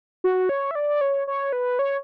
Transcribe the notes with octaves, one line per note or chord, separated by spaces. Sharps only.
F#4
C#5
E5
D5
C#5
C#5
B4
C#5